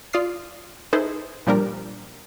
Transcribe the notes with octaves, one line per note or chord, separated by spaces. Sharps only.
F4 D5 D#6 F6 C7
D#4 E4 G#4 A4 B4 C5
A#2 F3 G3 D4 G4 A#4